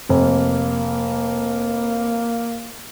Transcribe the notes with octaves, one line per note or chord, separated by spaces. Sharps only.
F1 A#3